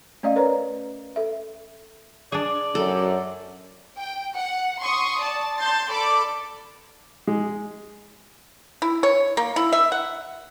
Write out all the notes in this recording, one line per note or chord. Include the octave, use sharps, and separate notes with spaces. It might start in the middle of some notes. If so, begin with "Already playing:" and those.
A3 C#4 D5 D#5 F5
A#4 B4 C#5 A#5
A4 E5
D4 G#4 D5
F#2 A4
G5
F#5
C6 C#6 D#6
D5 A5
A5 C6 G6 A6
A4 D5 B5 D6
G#3
E4
C#5
A#3
E4
E5
F#5